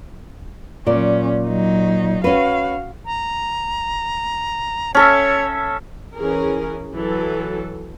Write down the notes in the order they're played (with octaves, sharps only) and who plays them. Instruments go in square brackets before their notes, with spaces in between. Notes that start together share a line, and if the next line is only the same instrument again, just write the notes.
[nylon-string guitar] A#2 D5 [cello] F#3 C#4
[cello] F#3 D#4
[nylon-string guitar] C#4 B4 [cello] F#4 F5
[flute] A#5
[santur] C#4 A4 E5 [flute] C#5
[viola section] E3 C#4 G#4 A#4
E3 F#3 A4